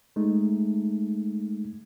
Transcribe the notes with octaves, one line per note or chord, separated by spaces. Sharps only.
G#3 A3 D#4